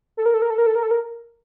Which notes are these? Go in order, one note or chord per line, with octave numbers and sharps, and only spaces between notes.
A4
A#4
A4
A#4
A4
A#4
A4
A#4
A4
A#4